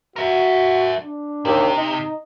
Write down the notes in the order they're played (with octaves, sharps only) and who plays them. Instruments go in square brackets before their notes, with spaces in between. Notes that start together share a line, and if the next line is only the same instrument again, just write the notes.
[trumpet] F#4 [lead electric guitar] A#4 E5
[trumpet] D4
[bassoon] D#2 [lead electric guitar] C3
[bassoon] D#4